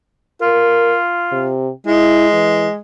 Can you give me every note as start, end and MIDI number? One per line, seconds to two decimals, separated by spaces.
0.41 1.51 65
0.41 0.97 70
1.32 1.70 48
1.87 2.79 56
1.87 2.27 64
2.33 2.68 52